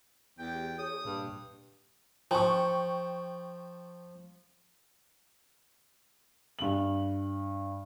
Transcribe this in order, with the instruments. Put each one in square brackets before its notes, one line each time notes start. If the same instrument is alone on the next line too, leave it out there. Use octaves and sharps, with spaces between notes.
[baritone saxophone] E2 [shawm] G5
[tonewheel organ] G4
[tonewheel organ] G#4 C#5 [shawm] D#6
[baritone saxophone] G2 [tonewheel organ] A#2
[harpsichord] F3 [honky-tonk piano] G5 C#6
[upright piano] G2 F#7